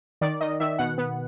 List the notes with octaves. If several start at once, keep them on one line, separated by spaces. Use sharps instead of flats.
D#3 D5
D#3 D#5
D#3 E5
B2 F#5
B3